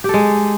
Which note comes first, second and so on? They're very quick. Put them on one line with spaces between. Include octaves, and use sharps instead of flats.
G4 A4 G#3